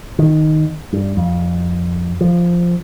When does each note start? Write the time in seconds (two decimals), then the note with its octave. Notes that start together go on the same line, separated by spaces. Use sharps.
0.19 D#3
0.93 G2
1.17 F2
2.21 F3